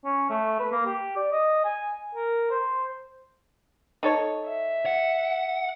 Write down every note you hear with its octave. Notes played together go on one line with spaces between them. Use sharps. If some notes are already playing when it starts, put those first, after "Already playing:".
C#4
A3
B4
A#3
G4
D5
D#5
G#5
A#4
C5
D#4 A4 C#5
E5
F#5